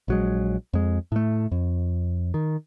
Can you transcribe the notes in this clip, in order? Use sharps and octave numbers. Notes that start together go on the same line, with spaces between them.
A#1 F#3 G#3
F2 G#3
A2 A3
F2
D#3